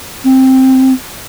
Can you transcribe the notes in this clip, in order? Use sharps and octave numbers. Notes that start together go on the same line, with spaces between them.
C4